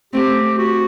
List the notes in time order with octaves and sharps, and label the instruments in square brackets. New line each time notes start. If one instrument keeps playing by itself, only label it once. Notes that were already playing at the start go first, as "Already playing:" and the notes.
[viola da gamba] A3 C4 [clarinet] G4
[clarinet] F#4